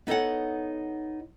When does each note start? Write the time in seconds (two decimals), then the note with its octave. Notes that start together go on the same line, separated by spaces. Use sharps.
0.07 B3 D#4 A4 C#5 F#5